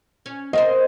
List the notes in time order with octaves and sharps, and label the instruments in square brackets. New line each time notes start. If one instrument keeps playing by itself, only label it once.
[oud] C#4
[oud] C4 A#4 C5 [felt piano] D#5